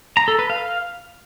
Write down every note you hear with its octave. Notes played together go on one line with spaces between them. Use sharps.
A#5
A4
B4
F5